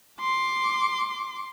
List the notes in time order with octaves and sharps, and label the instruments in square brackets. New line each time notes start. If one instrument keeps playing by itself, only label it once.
[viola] C6 D6